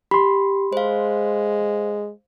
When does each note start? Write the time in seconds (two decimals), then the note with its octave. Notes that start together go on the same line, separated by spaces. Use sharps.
0.11 G4 B5 C6
0.73 G#3 C5 F5